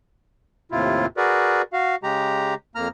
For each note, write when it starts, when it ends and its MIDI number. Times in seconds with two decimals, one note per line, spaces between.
0.72 1.06 39
0.72 1.06 45
0.72 1.06 48
0.72 1.06 64
0.72 1.06 65
1.17 1.62 66
1.17 1.62 68
1.17 1.62 70
1.17 1.62 71
1.17 1.62 74
1.73 1.96 66
1.73 1.96 77
2.03 2.54 49
2.03 2.54 56
2.03 2.54 67
2.03 2.54 82
2.75 2.88 41
2.75 2.88 58
2.75 2.88 82
2.75 2.88 89